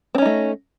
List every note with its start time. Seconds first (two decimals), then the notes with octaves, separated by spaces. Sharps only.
0.15 C4
0.18 C#4
0.22 D#4
0.26 A3